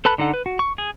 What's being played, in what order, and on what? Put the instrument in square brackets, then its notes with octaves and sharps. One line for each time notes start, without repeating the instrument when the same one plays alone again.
[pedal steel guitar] A4 B4 A5 B5 F#6
D3 D#4 A4 F#5
B4
F#4
C#6
G#4